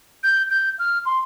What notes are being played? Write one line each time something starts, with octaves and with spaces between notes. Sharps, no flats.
G6
G6
F6
C6